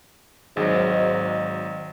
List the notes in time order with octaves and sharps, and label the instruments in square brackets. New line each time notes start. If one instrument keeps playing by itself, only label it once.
[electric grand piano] G#1 F#3 [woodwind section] G#2 [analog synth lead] D#5